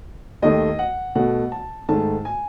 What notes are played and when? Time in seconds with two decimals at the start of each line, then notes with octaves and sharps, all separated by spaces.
0.42 D#2 D#3 A3 D#5
0.79 F#5
1.15 B2 A3 F#5
1.52 A5
1.89 G#2 D#3 A3 A5
2.25 G#5